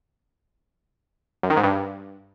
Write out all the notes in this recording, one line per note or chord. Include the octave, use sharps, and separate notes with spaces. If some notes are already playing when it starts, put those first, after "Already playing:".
F#2
D#3
G#2
G2